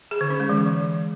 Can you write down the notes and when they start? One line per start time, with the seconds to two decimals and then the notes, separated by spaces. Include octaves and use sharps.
0.11 G#4
0.21 D3
0.30 C#4
0.40 G#3
0.49 E3